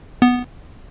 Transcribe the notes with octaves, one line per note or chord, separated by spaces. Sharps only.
B3